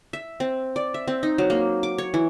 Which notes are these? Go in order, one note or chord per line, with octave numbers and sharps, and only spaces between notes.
E5
C4
D5
E5
C4
D#4
F#3
A#3
D6
C#5
E3